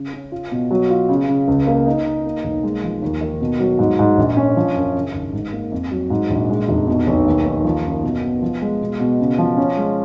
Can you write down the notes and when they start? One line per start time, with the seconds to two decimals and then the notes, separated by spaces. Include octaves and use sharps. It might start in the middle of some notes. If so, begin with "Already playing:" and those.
Already playing: C#3
0.13 C#4
0.32 F4
0.51 B2
0.71 F#3
0.90 F4
1.09 C#3
1.28 C#3
1.48 C#2
1.67 A#3
1.86 D#4
2.05 D#4
2.25 A#3
2.44 B1
2.63 G#3
2.83 F3
3.02 D#2
3.21 D#3
3.41 B2
3.60 F#3
3.79 G#2
3.99 G#2
4.18 A#1
4.37 C#4
4.57 F3
4.75 F#2
4.95 C#3
5.14 G#1
5.33 G#2
5.52 A#3
5.72 F2
5.91 F#3
6.10 G#2
6.30 A#1
6.50 G#3
6.68 F1
6.87 B2
7.07 B1
7.26 D#2
7.46 D#2
7.64 F3
7.85 F#2
8.03 B2
8.23 B3
8.42 F3
8.62 G#3
8.81 B2
9.00 B2
9.19 C#3
9.38 F3
9.57 C#4
9.77 G#3